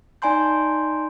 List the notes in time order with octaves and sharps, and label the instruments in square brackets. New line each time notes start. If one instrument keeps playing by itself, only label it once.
[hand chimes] D#4 D5 G#5 A#5 C6 G6